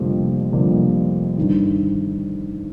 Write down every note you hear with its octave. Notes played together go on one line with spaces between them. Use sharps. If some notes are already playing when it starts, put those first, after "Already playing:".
Already playing: F1 F2 D3 G3 A#3
F1 F2 D3 G3 A#3
G1 G2 D#3